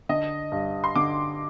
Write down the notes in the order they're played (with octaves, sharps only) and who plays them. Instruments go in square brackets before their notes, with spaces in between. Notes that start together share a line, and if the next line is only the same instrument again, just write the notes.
[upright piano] D3 [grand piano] D#5
[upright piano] G2
[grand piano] C6
[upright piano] D3 [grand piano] D6